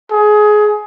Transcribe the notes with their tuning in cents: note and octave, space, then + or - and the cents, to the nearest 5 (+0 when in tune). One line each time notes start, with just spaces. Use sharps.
G#4 +20